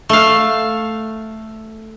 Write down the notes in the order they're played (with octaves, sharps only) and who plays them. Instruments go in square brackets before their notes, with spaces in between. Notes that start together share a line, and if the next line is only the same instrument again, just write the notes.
[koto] A3 F5